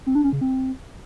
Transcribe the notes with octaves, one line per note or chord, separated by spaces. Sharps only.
C4
D4
C#4
C#3
C4